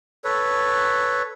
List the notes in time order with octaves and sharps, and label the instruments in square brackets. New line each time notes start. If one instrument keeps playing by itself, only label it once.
[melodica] A4 B4 C#5